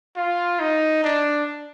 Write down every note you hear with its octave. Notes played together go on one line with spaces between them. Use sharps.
F4
D#4
D4